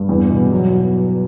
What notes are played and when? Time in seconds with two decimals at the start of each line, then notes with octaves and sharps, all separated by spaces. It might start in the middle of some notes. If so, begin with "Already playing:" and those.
Already playing: G2
0.09 E2
0.30 B2
0.52 F#3